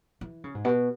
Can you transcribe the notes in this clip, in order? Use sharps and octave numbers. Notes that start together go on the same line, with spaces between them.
E3
C#3
G#2
B2